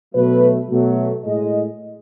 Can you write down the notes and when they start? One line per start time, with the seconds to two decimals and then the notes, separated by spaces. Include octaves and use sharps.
0.14 B2 F#3 A3 B4
0.70 B2 F#3 A3
1.25 A2 G#3 D#5